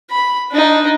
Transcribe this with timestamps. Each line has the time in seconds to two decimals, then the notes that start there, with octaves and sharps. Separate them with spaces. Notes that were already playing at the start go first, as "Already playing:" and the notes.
0.11 B5
0.51 D4 D#4